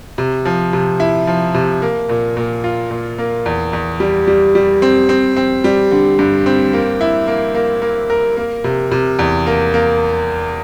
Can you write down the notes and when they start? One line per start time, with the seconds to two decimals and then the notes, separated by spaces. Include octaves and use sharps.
0.18 C3
0.45 F3
0.73 C3
1.00 E4
1.27 F3
1.54 C3
1.82 A#3
2.09 A#2
2.37 A#2
2.64 F4
2.91 A#2
3.19 A#3
3.46 E2
3.73 E2
4.00 G3
4.27 G3
4.55 G3
4.82 C4
5.09 C4
5.36 C4
5.64 G3
5.91 D3
6.19 G2
6.46 C4
6.73 A#3
7.01 E4
7.28 A#3
7.55 A#3
7.82 A#3
8.10 A#4
8.37 A#3
8.64 C3
8.91 C3
9.19 E2
9.47 A#3
9.74 A#3